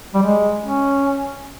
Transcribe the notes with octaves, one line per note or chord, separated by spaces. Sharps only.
G3
G#3
C#4